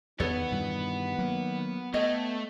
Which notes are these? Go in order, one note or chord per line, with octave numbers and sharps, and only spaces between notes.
E2 D#3 B3 A4 C#5 D5 F#5
G2 B2 E3
F#3 A#3
A3 B3 C#5 D#5 G5